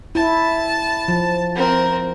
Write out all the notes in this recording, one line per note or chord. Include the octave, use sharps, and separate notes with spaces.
E4 A5
F3
C4 A#4